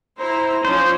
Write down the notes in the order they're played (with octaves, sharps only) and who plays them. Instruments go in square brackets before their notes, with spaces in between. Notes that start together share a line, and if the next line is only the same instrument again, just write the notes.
[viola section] E4 C5 A#5
[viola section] F3 C#4 D#4 [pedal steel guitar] C5